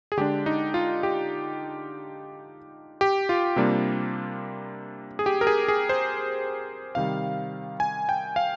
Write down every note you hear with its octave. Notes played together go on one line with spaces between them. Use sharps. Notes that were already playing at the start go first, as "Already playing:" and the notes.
G#4
D3 G#3 D4 G4
D#4
F4
G4
G4
F4
C3 G3 A#3 D4
G#4
G4
A#4
G#4
G#4
C5
C3 D#3 G3 F5
G#5
G5
F5